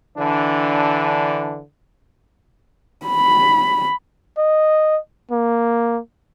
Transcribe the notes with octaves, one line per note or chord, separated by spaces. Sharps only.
D3 E3 D4
B5
D#5
A#3